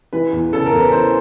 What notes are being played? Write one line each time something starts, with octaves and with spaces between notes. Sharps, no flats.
E3 B4
E2
C#3 A4
A#4
E2
B4
E3 C5